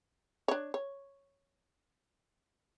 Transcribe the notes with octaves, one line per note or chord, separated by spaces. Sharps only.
D4 C#5
C#5